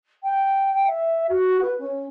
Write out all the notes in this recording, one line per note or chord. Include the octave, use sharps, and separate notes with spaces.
G5
E5
F#4
B4
C#4